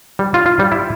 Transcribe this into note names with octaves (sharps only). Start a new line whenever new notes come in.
G3
F4
F4
G3
E4